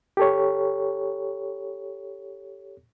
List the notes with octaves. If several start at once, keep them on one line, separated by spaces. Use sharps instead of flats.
G4 A4 C#5